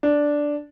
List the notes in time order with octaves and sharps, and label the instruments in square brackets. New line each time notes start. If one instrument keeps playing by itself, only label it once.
[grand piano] D4